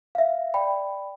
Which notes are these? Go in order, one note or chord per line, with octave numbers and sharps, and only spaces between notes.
E5 F5
D5 G5 B5